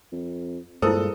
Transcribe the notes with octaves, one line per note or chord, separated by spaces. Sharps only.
F2
G2 A#2 G#3 E4 A4 A#4 C5 D#6